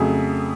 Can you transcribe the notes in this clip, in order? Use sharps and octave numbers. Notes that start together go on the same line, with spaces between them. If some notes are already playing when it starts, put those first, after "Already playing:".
Already playing: F2 C#3 F#3 A3 G#4